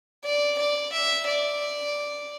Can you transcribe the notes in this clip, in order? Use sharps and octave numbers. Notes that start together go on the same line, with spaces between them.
D5
D5
E5
D5